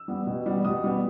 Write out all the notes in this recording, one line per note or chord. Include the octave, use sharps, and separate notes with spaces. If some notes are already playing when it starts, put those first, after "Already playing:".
Already playing: E6
G3 B3
B2
G3 B3
B2 D#6
G3 B3